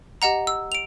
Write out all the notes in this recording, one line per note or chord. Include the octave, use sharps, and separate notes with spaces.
G4 D#5 F#5 A#5
E6
D7 F7